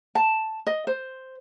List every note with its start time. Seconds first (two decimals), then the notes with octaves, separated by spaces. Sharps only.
0.15 A5
0.67 D#5
0.87 C5